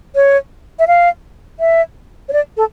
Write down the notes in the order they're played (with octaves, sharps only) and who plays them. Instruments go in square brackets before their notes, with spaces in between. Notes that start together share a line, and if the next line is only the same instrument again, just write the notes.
[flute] C#5
E5
F5
E5
C#5
D5
A4